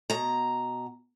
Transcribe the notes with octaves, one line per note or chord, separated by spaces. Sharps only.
B2 A#5